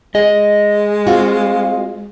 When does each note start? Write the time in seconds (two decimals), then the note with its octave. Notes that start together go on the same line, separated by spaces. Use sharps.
0.15 G#3 G#4 D#5
1.07 C4 F4 F#4 F5